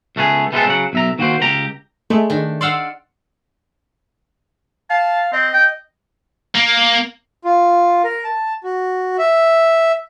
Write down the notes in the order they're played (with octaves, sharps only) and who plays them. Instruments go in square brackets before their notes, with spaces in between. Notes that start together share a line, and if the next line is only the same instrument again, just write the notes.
[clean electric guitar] C#2 A3 B3 F4 G#4
E3 G3 G#3 B3 C4 A4
C#3 F#3 F#5
B1 E5 A#5
D#3 A#3 F#4 C5
C#2 G4 A#5
[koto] G#3 [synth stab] A3
[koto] D#3 D4
[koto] D5 F5 F#5 [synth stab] C6 E6 F6
[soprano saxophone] F5 [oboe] A5
[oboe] C4 [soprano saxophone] D#5
[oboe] G5
[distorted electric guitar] A#3
[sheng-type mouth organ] F4
A#4
A5
F#4
E5